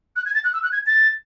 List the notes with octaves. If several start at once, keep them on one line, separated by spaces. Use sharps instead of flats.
F#6
G#6
A6
F#6
E6
F#6
G#6
A6